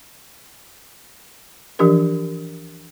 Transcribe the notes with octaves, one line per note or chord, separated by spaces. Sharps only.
E3 F3 D4 G4 A#4